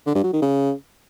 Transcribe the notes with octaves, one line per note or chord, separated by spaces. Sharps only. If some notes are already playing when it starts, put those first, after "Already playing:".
D3
G2
F#3
D#3
C#3